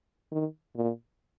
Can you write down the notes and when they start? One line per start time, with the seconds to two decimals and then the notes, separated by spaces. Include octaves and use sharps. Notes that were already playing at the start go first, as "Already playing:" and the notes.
0.32 D#3
0.76 A#2